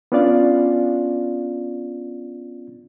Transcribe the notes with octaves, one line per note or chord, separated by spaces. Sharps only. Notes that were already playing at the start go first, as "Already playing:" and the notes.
B3 C#4 D4 F4 D5 F5